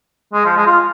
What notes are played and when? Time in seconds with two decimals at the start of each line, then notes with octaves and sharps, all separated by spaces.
0.34 G#3
0.45 F3
0.57 G#3
0.67 F4